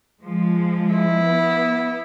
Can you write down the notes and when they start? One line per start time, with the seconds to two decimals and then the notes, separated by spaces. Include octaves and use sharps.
0.23 F3 G#3
0.94 E4
1.23 B3